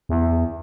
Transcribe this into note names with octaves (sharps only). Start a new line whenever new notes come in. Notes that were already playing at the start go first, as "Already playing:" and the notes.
E2